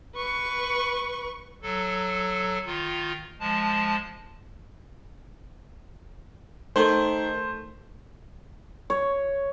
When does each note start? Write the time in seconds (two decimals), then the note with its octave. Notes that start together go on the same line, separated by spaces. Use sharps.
0.16 B4 C#6
1.62 F#3 A4
2.66 D#3 F4
3.40 F3 G#3 A5
6.76 D#3 A3 C5
8.90 C#5